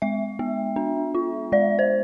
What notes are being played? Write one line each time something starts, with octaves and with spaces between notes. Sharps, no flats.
G#3 E5
B3
D4
F4
G#3 D5
C5